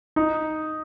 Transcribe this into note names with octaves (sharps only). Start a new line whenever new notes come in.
D#4